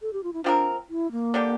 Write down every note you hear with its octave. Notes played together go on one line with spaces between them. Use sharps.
A4
G4
F4
E4
F3 C4 D4 G4 A#4
E4
A#3
D3 G3 D4 G4